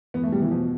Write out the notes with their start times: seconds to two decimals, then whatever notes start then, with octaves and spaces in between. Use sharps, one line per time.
0.14 E2 B3
0.23 A3
0.32 B2 G3
0.42 E3
0.51 B2 F3